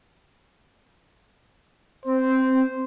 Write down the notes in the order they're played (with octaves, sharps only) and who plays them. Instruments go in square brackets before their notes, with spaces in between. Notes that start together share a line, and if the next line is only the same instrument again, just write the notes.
[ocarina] C4 [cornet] C5